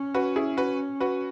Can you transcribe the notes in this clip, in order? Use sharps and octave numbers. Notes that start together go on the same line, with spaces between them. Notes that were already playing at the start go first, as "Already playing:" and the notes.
Already playing: C#4
F#4 B4
E4 G#4
F#4 B4
F#4 B4